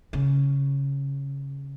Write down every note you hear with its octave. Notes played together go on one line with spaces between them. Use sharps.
C#3